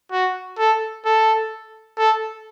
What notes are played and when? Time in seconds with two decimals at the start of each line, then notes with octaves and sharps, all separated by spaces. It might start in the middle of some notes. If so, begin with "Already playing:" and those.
0.12 F#4
0.58 A4
1.05 A4
1.98 A4